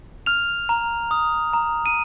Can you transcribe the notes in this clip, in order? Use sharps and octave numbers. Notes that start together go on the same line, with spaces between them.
F6 F7
A#5
D#6
A#5
D#7